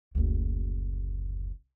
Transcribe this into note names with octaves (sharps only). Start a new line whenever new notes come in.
F#1 D2